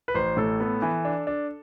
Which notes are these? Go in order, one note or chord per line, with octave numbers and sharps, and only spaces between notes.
B4
A1 C5
A2 A4
B3
E3
D4
D4